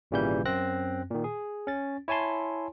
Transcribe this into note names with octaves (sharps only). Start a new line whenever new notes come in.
G#1 A#2 C#3 E3 G3 G6
F#2 C4 F#6 A#6
A#2 D#3
G#4
C#4 A6
E4 C#5 G#5 A5 C6